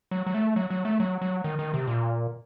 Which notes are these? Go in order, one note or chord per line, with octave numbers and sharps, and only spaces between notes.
F#3
F#3
A3
F#3
F#3
A3
F#3
F#3
D#3
D#3
C3
A#2